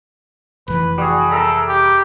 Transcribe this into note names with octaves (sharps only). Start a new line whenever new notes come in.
F1 E3 B4
G3 F#4 G#4
A4 A#4 E5 A#5
G4